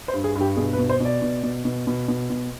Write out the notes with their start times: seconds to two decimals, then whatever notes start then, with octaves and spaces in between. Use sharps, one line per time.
0.08 C5
0.14 G2
0.24 G#4
0.35 G2
0.41 G4
0.57 B2 G#4
0.73 B4
0.78 B2
0.89 C5
1.00 B2 D5
1.22 B2
1.43 B2
1.65 B2
1.87 B2
2.08 B2
2.30 B2